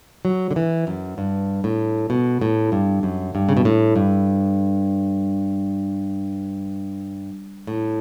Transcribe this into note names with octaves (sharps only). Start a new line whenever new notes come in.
F#3
D3
E3
F#2
G2
A2
B2
A2
G2
F#2
G2
C#3
B2
A2
G2
A2